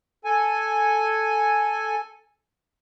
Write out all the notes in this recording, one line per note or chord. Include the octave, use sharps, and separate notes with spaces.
A4 G#5